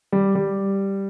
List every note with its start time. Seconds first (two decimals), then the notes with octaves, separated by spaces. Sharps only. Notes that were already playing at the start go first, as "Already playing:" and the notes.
0.12 G3
0.35 G3